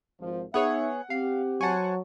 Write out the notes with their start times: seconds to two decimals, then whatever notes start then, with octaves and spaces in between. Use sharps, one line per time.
0.20 G#1 F3
0.54 B3 D#4 G#4 C#5 E5 F#5
1.10 C4 G4 F5
1.61 F#3 C5 F#5 G#5 A5 C#6